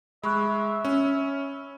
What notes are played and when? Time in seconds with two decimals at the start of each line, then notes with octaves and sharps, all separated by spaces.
0.23 G#3 E5 B5 C#6 F#6
0.85 C#4